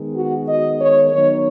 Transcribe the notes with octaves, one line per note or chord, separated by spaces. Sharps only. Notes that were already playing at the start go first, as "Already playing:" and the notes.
Already playing: D#3 G#3 B3
F#4
D#5
C#5
D#3 F#3 B3 C#5